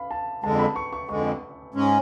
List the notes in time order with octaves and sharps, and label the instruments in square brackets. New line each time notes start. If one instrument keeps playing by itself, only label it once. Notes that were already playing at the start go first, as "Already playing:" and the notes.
Already playing: [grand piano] F5 B5
A5
[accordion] F2 D3 G#3 [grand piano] A5
[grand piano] B5
C#6
C#6
[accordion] F2 D3 G#3 [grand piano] C#6
[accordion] G#2 G#3 C#4